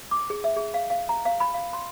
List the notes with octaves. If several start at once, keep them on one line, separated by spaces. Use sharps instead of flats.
D6
G#4
E5
G#4
F5
F5
A#5
F5
B5
F5
C6